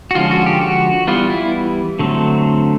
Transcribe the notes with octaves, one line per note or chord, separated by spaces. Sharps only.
F#4
D3 F3 G#3 C#4 F4
F#4
G4
F#4
E3 G3 B3 F4
E4
D3 F#3 A3 C4